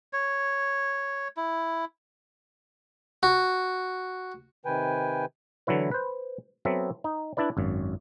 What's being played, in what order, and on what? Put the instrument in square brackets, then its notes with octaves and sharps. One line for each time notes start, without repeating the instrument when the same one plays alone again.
[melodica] C#5
E4
[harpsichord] F#4
[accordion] C3 D#3 B4 G5 G#5
[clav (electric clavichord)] D3 E3 F#3 E4 B4
B4 C5
F#3 B3 C4 A4 E5
D#4
D4 E4 B4 D5
G#1 F#2